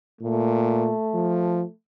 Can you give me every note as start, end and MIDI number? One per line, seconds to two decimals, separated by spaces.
0.21 0.92 46
0.21 1.72 57
1.14 1.64 53